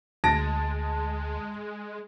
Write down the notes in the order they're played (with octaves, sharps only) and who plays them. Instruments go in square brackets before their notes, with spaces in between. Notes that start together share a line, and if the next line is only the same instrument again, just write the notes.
[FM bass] D2 [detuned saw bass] G#3 [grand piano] A5 A#6 D7